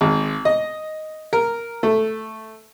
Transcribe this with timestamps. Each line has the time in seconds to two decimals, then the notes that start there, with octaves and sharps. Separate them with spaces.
0.01 G#1
0.45 D#5
1.33 A#4
1.83 A3